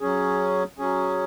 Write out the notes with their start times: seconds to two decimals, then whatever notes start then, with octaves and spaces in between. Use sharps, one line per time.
0.01 F#3 C#4 G#4
0.79 F#3 C#4 G#4